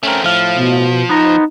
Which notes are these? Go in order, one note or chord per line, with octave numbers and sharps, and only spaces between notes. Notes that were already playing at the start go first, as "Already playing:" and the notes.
A3 C4 C#4 A#4
A2 F3 F5
B2
B3 D#4 C5 A#5